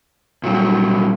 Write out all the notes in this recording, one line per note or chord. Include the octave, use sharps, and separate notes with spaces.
A#2 F#3 G3